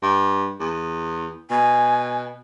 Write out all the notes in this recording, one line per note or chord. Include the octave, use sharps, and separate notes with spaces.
G2
E2
B2 G#5